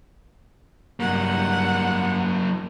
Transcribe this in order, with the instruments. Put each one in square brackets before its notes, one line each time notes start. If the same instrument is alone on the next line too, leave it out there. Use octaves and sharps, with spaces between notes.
[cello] G2 F#5 [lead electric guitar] F#3 A#3